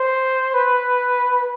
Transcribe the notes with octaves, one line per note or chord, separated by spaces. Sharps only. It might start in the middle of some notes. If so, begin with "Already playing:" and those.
Already playing: C5
B4